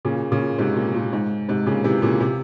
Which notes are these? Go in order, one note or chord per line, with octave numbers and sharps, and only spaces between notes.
A#2 C#3
A#2 C#3
G#2 C3
A#2
A#2
G#2
G#2 C3
A#2 C#3
C3 E3
A#2 C#3
C3